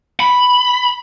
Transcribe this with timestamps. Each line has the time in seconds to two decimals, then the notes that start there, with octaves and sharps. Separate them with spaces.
0.20 B5